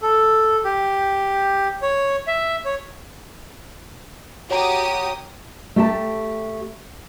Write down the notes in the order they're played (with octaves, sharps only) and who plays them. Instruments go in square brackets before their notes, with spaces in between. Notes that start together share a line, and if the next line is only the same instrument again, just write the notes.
[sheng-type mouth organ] A4
G4
C#5
E5
C#5
[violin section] F#4 G4 D#6 [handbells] C#5 A#5
[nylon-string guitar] A3 G4 A5